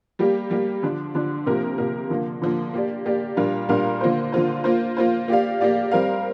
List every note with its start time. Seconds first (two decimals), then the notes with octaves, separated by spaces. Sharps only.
0.19 G3 A#3 G4
0.50 G3 A#3 G4
0.83 D3 F3 D4
1.15 D3 F3 D4
1.46 C3 F3 A#3 G4 A#4
1.78 C3 F3 A#3 G4 A#4
2.10 D3 F3 A#3
2.42 D3 F3 A#3
2.74 A#3 G4 D5
3.06 A#3 G4 D5
3.37 A#2 G3 D4 A#4 F5
3.69 A#2 G3 D4 A#4 F5
4.01 D3 A#3 F4 C5
4.32 D3 A#3 F4 C5
4.64 A#3 F4 C5
4.97 A#3 F4 C5
5.28 A#3 G4 D5 F5
5.60 A#3 G4 D5 F5
5.91 G3 C4 A#4 F5